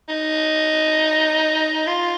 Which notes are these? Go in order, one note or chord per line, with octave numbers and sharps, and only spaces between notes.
D#4
F4